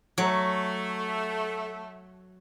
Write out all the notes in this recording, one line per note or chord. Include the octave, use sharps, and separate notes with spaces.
F#3 A3